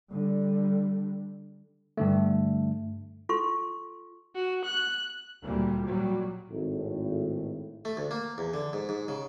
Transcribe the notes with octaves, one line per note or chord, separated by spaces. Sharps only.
D3 G3
G2 D3 A3
F4 A4 C6 C#6
F#4
F#6
D2 A#2 G3
A#2 F#3 G3
G#1 A2
A3
D2
A#3
E2
D3
G#2
G#2
C#3